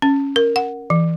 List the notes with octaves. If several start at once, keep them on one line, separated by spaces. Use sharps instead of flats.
C#4
A#4
F#5
E3